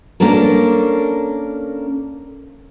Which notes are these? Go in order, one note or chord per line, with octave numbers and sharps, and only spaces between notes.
A#3 C#4 D4 A4 A#4